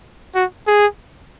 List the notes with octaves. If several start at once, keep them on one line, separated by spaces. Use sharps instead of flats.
F#4
G#4